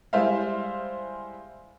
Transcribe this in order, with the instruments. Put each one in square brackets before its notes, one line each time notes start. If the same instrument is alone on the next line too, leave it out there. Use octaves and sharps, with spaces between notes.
[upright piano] G3 G#3 E4 C5 E5 F5